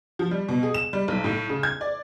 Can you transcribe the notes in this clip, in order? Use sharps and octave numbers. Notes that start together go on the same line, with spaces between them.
F3
G3
B2
G#4
E7
G3
B1
A2
C#3
G#6
D5